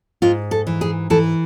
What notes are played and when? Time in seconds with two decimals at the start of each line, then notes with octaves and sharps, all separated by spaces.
0.22 G#2 F4
0.51 A4
0.67 E3
0.81 G#4
1.10 E3 A4